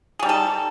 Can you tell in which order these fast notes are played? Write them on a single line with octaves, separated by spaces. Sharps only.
G#4 G3 D#4 A4